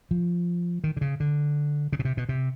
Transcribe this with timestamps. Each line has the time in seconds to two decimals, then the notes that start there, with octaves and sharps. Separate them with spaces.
0.11 F3
0.84 D#3
0.97 D3
1.01 C#3
1.20 D3
1.92 C#3
1.99 B2
2.05 C3
2.17 B2
2.29 C3